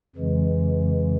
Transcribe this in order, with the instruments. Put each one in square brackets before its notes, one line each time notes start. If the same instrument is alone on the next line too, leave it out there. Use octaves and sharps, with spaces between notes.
[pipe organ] F2 C#3 E3 G#3